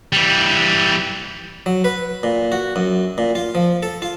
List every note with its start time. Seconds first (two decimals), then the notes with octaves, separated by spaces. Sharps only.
0.13 E3 G3
1.66 F#3
1.84 B4
2.23 A#2
2.52 F#4
2.76 F#2
3.18 A#2
3.35 F4
3.55 F3
3.83 A4
4.02 F4